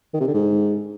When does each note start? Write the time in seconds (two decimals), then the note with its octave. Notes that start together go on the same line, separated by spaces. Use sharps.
0.14 D#3
0.20 C3
0.27 D3
0.34 G#2